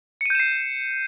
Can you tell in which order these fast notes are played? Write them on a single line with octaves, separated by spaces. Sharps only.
C#7 D#7 G6 E7 C7